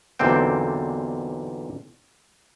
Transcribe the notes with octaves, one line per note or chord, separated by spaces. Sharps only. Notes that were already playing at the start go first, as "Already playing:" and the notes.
B1 E2 A#2 D3 C4 G5